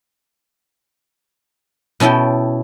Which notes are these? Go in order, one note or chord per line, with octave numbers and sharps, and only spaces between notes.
B2 C#4 E4 A4 G5